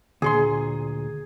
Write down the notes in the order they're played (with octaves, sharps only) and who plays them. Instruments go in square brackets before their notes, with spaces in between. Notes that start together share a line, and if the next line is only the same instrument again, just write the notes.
[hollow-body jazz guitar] D2 A#2 C6 [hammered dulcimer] G#4